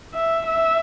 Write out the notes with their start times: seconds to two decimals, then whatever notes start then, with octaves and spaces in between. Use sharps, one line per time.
0.14 E5
0.48 E5